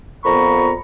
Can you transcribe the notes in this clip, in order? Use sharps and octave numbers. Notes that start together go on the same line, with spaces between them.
F2 A#2 B3 A#5 B5 C#6